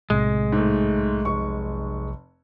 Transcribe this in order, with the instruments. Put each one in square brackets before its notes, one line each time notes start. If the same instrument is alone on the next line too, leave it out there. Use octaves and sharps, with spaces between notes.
[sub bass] B1 [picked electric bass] A2 C3 [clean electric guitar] G#3
[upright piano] G#2 A3
F1 C#6